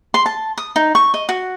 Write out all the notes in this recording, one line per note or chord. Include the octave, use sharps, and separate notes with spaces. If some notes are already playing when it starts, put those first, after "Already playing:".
C6
A5
D#6
D#4
C#6
D#5
F#4